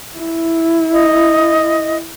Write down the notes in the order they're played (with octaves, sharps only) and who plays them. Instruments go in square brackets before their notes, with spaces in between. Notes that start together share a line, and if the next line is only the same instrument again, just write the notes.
[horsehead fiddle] E4
[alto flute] D#5